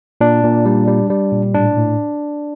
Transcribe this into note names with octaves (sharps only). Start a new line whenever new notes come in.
A#2 D4
A#2
G3
G3
G3
A#2
A2 D4
A2